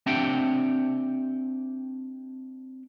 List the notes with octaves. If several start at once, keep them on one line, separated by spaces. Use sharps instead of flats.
C4 D4 G4 E5 F#5 G5